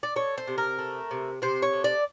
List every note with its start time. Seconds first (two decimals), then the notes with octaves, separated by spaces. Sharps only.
0.03 D5
0.16 A3 C#5
0.38 C5
0.48 C3
0.58 A#4
0.79 A3
1.11 C3
1.42 C3 C5
1.62 C#5
1.73 A3
1.84 D5